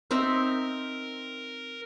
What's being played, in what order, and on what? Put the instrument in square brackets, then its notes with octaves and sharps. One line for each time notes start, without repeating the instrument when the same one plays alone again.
[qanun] C4 D#4 E5 [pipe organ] A#4